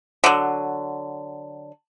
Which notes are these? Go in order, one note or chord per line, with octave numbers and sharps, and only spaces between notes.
D3 F#3